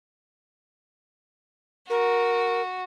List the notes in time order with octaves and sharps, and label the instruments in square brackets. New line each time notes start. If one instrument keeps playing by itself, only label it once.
[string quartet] F#4 [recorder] A#4